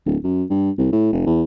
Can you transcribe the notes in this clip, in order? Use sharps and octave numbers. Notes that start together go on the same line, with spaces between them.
D1
F#2
G2
C2
A2
F1
E2